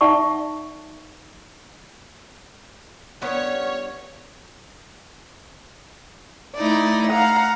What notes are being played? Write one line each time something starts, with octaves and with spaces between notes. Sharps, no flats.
D#4 D5 E5 F#5 A5 C#6
G2 G3 B3 C#4 F4 C#5
A3 D#4 E4 D5
F5 F#5 A#5